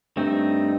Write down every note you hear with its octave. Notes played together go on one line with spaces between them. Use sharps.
G2 A3 C4 D#4